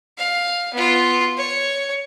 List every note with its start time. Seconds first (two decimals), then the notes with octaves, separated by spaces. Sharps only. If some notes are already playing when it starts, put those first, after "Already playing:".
0.18 F5
0.73 B3 F4
1.37 C#5